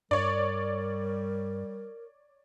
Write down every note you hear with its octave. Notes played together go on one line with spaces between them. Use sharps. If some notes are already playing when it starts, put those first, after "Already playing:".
G2 G3 A#4 C#5 D5